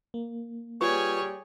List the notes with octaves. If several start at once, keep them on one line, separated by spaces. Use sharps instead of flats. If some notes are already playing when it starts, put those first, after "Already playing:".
A#3
G3 F4 G#4 B4 C#5 C#6